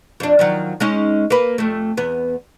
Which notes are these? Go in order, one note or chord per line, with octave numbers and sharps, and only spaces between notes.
F2 D4
D#3 F3 F#3
G#3 C#4 D#4
A#3 B4
F2 A3
E2 B3